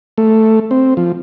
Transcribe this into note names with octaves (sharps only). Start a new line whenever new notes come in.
A3
C4
F3